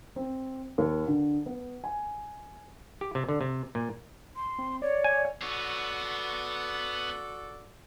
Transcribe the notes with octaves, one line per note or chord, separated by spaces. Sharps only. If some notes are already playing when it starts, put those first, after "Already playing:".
C4
D#2
D3
B3
G#5
G4
C3
D3
C3
A#2
C6
C4
C#5 D5
G#5
B3 F#4 A4 C#5 D5